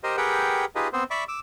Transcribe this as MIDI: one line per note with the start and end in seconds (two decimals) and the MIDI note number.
0.04 0.16 67
0.04 0.16 70
0.04 0.16 72
0.04 0.16 75
0.17 0.65 67
0.17 0.65 68
0.17 0.65 70
0.17 0.65 71
0.17 0.65 78
0.17 0.65 79
0.76 0.88 63
0.76 0.88 65
0.76 0.88 67
0.76 0.88 68
0.76 0.88 71
0.76 0.88 75
0.93 1.04 59
0.93 1.04 60
0.93 1.04 72
1.11 1.24 74
1.11 1.24 76
1.11 1.24 83
1.11 1.24 85
1.11 1.24 86
1.28 1.40 86
1.28 1.40 88